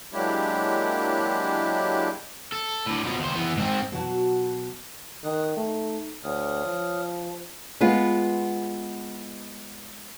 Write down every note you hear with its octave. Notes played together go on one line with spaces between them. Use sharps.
F#3 G#3 A#3 D4 E4 G4
A4
A2 D3
B2 F3
D#2 C5
E3 B3
G#2 C4
B2 F#3 F#4 A5
D#3 D#6 F#6
A3 D#4
D2 C#5 D#6 F6
F3
G#3 B3 F4